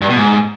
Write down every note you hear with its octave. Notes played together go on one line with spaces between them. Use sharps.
G2
B2
G#2